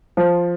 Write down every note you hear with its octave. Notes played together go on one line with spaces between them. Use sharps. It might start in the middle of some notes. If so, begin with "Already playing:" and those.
F3